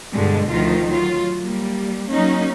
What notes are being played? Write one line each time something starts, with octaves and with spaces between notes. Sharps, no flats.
G2 B2 D3 G3 G#3
D2 D#3 F3 F4
F#3 F4
G3 A#3
F#3 A#3 C#4 D#4